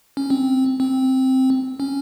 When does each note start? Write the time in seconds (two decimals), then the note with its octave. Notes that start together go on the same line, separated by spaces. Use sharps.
0.17 C#4
0.30 C4
0.80 C4
1.80 C#4